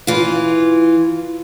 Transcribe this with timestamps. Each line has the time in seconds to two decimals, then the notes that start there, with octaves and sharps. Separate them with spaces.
0.07 E3 F4